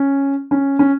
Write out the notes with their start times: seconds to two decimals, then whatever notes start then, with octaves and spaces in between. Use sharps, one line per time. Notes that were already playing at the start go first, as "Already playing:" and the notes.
Already playing: C#4
0.51 C#4
0.79 C#4